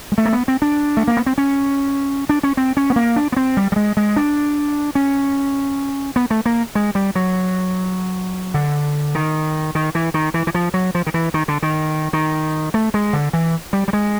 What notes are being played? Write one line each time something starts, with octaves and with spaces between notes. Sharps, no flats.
G#3
A3
A#3
B3
C4
D4
A3
A#3
B3
C4
C#4
D4
C#4
C4
C#4
B3
A#3
D4
B3
C4
G3
G3
G#3
G#3
D4
C#4
B3
A3
A#3
G#3
G3
F#3
D3
D#3
D#3
E3
D#3
E3
E3
F3
F#3
F3
D#3
E3
D#3
D3
D#3
D#3
A3
G#3
D3
E3
G3
G3
G#3